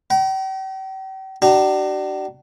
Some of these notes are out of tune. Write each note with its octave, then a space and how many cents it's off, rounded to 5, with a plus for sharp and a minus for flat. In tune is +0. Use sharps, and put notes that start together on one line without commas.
G5 -40 A#5 +35
D4 +20 F#4 +45 A#5 +0